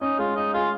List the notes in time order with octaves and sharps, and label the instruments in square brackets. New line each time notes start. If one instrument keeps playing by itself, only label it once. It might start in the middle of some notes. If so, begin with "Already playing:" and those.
[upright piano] C#4 [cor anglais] D#4
[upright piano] G#3 [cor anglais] F4
[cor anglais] D#4 [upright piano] D#5
[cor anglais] F4 [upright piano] G#4